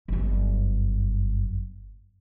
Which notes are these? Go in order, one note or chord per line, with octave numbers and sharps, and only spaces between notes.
G1 F#2